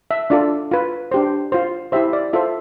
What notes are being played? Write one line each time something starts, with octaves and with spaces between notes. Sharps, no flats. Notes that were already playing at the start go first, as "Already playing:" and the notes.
E5
D4 F4 A4 D5
F4 B4
D4 G4 C5
F4 C5
E4 G4 C5 E5
D5
F4 A4 C5 E5